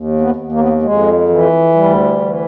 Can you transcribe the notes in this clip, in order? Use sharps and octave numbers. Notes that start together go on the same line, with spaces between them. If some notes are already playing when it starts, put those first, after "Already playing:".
Already playing: D#2
B3
D#2
A#3
B3
A#3
F2 G#3
E3
D2 G3
E3